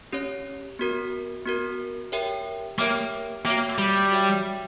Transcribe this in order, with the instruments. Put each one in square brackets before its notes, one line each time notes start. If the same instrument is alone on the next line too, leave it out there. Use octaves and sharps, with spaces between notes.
[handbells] C#4 G4 C#5
B3 F#4 A#4
B3 F#4 A#4
G4 A#4 C#5 E5 G5
[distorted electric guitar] A#3 [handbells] G4 A#4 C#5 E5 G5
[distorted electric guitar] A#3 [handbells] F#4 C#5 E5 G5
[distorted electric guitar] G3
[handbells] F#4 C#5 E5 G5